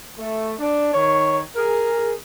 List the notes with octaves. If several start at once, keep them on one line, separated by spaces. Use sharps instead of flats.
A3
D4
D#3 C#5
G#4 A#4